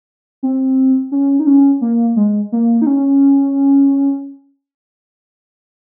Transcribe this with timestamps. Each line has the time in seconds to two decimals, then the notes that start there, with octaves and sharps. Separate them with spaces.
0.43 C4
1.12 C#4
1.39 D#4
1.47 C#4
1.81 A#3
2.16 G#3
2.52 A#3
2.82 D#4
2.87 C#4